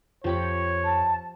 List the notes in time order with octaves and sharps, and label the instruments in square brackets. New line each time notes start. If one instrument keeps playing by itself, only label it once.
[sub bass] F2 [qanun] F3 G4 B5 [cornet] C#5
[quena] A5